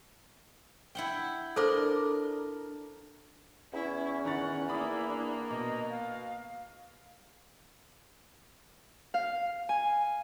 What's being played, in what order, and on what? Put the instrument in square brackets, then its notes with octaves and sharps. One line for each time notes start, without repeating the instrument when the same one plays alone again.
[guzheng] E4 F#5 G5
[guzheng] D4 A#4 [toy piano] A4 C5 D6
[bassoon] E2 [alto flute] C#4 [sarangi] E4
[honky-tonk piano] D#3 A#5 A6 [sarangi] F#5
[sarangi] A#3 [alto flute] E4 [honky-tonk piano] D5 B5 D#6
[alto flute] D4
[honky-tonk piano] B2 [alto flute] D#5
[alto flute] F5
[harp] F5
G#5